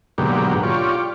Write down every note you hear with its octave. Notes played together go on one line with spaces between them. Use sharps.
G#2 B2 D3 F#3 A#3 G4
F4 G4 C#5 D5